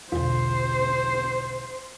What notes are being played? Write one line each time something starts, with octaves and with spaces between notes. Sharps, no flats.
B1 E2 D3 F4 C5